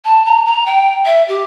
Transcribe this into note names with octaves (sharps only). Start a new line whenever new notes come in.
A5
A#5
A#5
G5
E5
G4